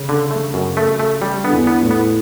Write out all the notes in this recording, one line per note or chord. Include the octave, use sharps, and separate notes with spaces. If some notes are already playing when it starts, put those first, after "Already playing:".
Already playing: C#3 C#4
D3
A3
F#2
A3
A3
G3
D3 B3
E2 E3
B3
A2
B3